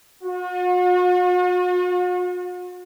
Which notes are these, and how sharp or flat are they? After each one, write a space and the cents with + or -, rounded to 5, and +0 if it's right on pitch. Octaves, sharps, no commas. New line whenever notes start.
F#4 -45